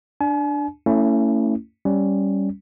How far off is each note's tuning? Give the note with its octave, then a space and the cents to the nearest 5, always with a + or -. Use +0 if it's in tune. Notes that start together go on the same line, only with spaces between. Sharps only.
D4 +0 G#5 +45
A3 +30 C#4 +0 E4 +0
G3 +0 C#4 +0